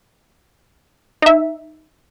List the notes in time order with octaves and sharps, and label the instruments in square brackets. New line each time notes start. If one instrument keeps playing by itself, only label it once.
[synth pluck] D#4 E5